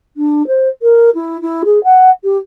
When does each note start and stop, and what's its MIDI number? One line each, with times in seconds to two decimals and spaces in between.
0.17 0.46 62
0.47 0.68 72
0.82 1.10 70
1.15 1.40 64
1.42 1.63 64
1.65 1.82 68
1.84 2.10 78
2.24 2.38 67